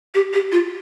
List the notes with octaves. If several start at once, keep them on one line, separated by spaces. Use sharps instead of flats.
G4
G4
F4